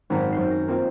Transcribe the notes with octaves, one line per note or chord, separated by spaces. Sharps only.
G#1 F#2 C4 A#5 B6
F#2 G6 C7
A#6
A#3 C4 D#4 F4